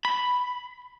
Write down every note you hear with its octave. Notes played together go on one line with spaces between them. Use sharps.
B5